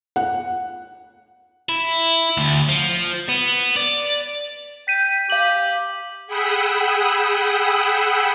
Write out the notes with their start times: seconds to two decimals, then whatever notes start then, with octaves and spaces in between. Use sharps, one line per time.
0.16 F#5
1.69 E4
2.37 D2
2.69 F3
3.29 B3
3.76 D5
4.88 G5 B6 D#7
5.30 G4 F5 F#7
6.27 G#4 F#5 G5 B5 D#6 E6